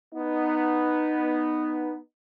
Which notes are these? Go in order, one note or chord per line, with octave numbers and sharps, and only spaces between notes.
B3 D#4